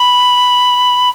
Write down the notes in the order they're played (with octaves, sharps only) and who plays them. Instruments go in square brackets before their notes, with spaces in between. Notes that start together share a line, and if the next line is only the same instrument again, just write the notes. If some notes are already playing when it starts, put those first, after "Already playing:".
Already playing: [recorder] B5